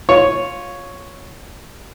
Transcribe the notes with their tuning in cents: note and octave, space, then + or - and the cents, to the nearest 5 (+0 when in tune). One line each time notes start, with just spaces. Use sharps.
F4 +15 C#5 +0